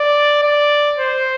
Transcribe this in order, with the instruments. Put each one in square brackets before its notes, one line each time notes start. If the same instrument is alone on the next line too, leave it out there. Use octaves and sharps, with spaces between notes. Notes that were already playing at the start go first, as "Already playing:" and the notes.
Already playing: [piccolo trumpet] D5
D5
C5